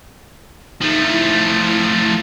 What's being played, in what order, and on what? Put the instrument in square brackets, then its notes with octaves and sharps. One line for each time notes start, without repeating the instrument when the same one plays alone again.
[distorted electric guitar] F3 A3 [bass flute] D#4
[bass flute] E4